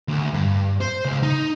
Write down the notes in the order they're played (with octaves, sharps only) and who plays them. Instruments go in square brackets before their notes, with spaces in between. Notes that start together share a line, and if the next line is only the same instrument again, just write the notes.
[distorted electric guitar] D2
G2
C5
C#2
D#4